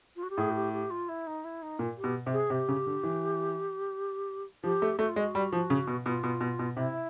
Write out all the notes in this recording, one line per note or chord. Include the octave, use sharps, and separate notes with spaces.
F4
F#4
G4
A2 G#4
F#4
G4
G4
F4
E4
D#4
E4
D#4
A#2
G4
B2
C3
G#4
C3 G4
C#3
D3
E3
F3 G4
A3
A3 F#4
F4
G#3 F#4
G3
F3
C#3
B2
B2 F4
B2
B2
B2
C3 E4